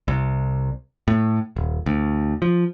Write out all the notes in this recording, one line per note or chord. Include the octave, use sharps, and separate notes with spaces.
C2
A2
D#1
D2
F3